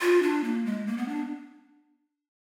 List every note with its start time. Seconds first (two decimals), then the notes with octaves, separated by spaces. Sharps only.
0.01 F4
0.22 D4
0.44 A#3
0.66 G#3
0.87 A#3
0.97 B3
1.08 D4